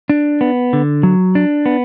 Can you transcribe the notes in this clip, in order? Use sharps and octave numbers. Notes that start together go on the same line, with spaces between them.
D4
B3
D3
F#3
D4
B3